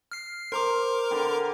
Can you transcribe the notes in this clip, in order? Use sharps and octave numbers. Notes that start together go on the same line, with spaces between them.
F6 C7
A#4 C5 A#5 D6
D3 B4 G5